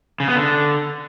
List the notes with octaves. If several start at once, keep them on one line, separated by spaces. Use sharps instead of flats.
C#3
B3
D3